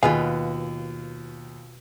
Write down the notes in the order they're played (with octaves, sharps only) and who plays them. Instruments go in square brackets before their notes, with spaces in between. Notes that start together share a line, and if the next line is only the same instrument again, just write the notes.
[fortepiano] D#2 [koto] B2 [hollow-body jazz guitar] F4 B4 F5 [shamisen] G#4